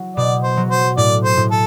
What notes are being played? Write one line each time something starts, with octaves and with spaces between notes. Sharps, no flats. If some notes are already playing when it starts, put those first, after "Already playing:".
Already playing: F#3 E4
B2 D5
C5
F#3
C5
A2 D5
C5
A2
A4